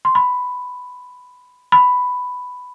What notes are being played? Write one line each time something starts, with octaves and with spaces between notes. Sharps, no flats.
C6
B5
B5